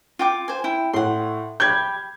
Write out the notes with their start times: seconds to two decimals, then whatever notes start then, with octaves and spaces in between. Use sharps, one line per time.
0.19 F4 G5 D6
0.48 C5 G#5
0.64 E4 G5
0.93 A2 F#5 C6
1.60 G4 B5 G6 G#6